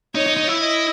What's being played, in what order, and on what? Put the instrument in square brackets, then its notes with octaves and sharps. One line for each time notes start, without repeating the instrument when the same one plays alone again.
[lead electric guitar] D#4 [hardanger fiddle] C#5
[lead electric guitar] D#4
D#4
E4
[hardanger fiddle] D#5